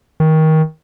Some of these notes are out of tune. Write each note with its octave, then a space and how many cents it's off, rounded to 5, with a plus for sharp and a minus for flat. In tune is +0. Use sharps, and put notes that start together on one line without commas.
D#3 +20